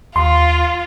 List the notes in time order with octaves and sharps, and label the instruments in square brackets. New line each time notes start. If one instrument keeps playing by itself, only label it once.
[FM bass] D#2 [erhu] F4 [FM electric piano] C6